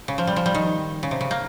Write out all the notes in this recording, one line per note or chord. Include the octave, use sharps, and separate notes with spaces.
C#3
F3
G3
F3
G3
D#3
C#3
C3
C#3
A#3